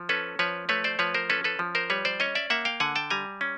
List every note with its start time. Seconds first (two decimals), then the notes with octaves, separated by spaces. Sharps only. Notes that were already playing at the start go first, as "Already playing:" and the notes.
Already playing: F3
0.09 C#4 A4 B4
0.39 F3 B4 C#5
0.69 A3 B4 C#5
0.84 C5 D5
0.99 F3 B4 C#5
1.14 A#4 C5
1.30 C#4 A4 B4
1.44 A4 B4
1.59 F3
1.75 A#4 C5
1.90 G3 B4 C#5
2.05 C5 D5
2.20 C#4 C#5 D#5
2.35 D5 E5
2.50 A#3 E5 F#5
2.65 F5 G5
2.80 D3 F#5 G#5
2.96 G5 A5
3.10 G3 G#5 A#5
3.41 C#4